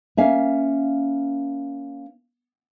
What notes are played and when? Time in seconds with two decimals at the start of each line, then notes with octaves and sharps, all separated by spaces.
0.17 A#3 C#4 E5 F5